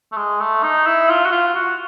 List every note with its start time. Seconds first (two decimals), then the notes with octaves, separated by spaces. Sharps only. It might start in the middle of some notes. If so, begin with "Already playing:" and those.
0.12 A3
0.17 G#3
0.41 A3
0.63 D#4
0.86 E4
1.09 F4
1.25 F#4
1.31 F4
1.54 F#4